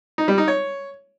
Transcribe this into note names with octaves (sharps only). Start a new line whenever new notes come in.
D#4
G3
D#4
C#5